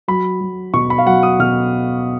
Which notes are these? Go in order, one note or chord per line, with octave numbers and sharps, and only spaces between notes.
F#3 B5
F#3
B2 C#6
B5
F5
F#3 F#5
D#6
B2 F6